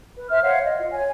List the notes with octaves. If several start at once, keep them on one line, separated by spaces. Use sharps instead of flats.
B4
C5 E5 F6
C5 C#5 F5 F#5
D#5
F4
C#5 G#5